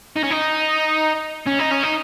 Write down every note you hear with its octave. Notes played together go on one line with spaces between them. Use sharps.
D#4
C#4
D#4
C#4
D#4
C#4
D#4